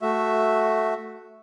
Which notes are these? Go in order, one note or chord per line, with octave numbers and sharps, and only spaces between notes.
A3 F#4 E5